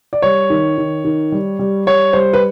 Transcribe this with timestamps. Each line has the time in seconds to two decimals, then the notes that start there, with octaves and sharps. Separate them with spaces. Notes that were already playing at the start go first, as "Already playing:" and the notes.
0.13 D5
0.22 G3 C#5
0.50 D#3
0.78 D#3
1.05 D#3
1.32 G3
1.59 G3
1.86 G3 C#5
2.13 G3 C5
2.33 B4